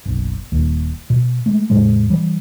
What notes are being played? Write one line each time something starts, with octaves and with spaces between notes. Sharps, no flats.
F#1 B1
D#1 D#2
B2
G#3 A3
E2 A2 C#3 G#3
E3 G3